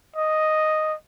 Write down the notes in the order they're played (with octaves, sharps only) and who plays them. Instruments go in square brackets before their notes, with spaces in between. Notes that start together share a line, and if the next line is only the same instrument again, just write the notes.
[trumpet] D#5